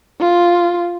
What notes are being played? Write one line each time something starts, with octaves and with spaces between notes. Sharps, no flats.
F4